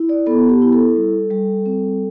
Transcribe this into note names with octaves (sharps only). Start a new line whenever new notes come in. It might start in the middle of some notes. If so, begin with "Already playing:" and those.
Already playing: E4
D5
B3 A4
G4
E4
A4
G3
G3
C4